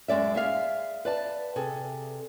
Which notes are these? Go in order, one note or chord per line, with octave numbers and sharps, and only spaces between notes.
F#2 G#3 D5 E5
G#4 E5 F5
B4 D5 A5
C3 G#4 A4